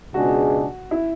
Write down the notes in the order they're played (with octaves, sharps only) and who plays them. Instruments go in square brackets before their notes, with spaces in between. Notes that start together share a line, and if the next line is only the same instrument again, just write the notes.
[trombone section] C#2 B2 G#3 D4 G#4 [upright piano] F#4
[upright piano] E4